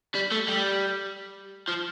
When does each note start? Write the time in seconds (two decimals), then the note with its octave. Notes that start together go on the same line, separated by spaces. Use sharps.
0.14 G3
0.31 A3
0.48 G3
1.69 F3